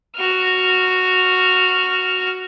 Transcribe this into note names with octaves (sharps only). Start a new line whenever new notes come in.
F#4 F6